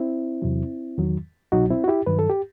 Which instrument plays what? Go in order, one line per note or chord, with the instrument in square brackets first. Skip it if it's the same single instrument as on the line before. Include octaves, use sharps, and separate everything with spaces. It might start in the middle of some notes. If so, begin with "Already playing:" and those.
Already playing: [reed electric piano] C4 E4
E2 C3 F#3
E2 D#3 F#3
C2 B2 F#3 D#4 F#4
C4 E4
F#4
E4 G4
G2 D#3 F#3 B4
A4
G4